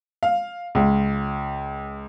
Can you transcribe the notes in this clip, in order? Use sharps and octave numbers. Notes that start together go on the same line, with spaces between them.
F5
C#2